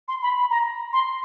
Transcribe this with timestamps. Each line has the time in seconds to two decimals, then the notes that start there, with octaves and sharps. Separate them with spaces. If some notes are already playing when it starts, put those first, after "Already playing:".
0.08 C6
0.22 B5
0.50 A#5
0.93 C6